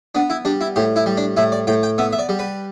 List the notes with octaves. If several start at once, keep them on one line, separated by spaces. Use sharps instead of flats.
B3 D4
E4
G3 D4
E4
A2 G4
E4
G3
D4
A2 E4
D5
A2 G5
G5
B3 E5
E5
D5
G3
B4